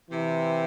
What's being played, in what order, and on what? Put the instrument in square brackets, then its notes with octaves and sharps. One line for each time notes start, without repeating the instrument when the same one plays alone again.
[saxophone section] C3 [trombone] E3